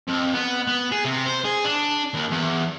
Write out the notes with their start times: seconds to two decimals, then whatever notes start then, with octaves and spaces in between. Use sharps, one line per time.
0.08 F2
0.34 B3
0.67 B3
0.92 G#4
1.05 C3
1.26 C5
1.45 G#4
1.64 D4
2.14 D#2
2.31 E2